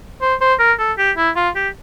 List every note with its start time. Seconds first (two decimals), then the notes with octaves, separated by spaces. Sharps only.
0.22 C5
0.41 C5
0.60 A#4
0.79 A4
0.98 G4
1.17 E4
1.36 F4
1.56 G4